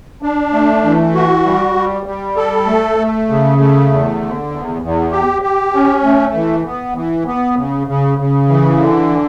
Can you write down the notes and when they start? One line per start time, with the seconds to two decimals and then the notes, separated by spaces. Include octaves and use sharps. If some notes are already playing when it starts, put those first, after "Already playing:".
0.22 D4
0.53 A3
0.84 E3
1.15 F#4
1.45 G3
1.75 G3
2.06 G3
2.36 A4
2.67 A3
2.98 A3
3.29 C#3
3.58 A3
3.89 E2
4.21 D3
4.51 E2
4.82 E2
5.12 G4
5.42 G4
5.73 C#4
6.04 A3
6.34 E3
6.65 B3
6.95 E3
7.27 B3
7.57 C#3
7.87 C#3
8.18 C#3
8.49 E3
8.79 D3